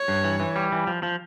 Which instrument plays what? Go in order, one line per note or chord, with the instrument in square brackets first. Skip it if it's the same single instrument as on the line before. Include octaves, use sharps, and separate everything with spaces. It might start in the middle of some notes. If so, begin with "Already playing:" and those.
Already playing: [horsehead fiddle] C#5
[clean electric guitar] G2
E3
E3
G3
E3
F3
F3